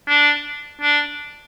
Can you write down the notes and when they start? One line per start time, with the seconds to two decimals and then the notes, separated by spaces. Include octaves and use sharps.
0.08 D4
0.82 D4